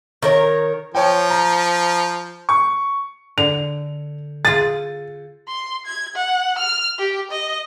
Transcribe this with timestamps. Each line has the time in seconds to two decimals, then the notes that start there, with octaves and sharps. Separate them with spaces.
0.22 D#3 A#4 C#5
0.95 F3 C#5 G5
1.30 A#5
2.49 C#6
3.38 D3 F7
4.45 F4 G#4 A6
5.48 C6
5.86 G#6
6.16 F#5
6.59 F6
6.99 G4
7.31 D#5